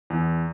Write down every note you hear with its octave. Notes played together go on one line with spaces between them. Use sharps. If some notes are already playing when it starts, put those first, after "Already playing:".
E2